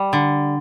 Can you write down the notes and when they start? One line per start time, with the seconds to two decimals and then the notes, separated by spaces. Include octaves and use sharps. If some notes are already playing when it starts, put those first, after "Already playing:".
Already playing: G3
0.13 D3